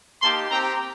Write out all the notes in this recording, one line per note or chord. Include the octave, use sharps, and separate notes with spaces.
A#3 D#4 G4 A5 C6
C4 G4 G5 A#5